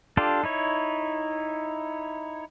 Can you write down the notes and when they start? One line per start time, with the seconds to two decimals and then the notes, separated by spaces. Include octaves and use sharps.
0.17 D4 F4 G4 A4
0.44 D#4 E4 C#5